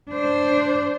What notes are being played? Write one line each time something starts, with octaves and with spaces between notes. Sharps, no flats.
D4 C5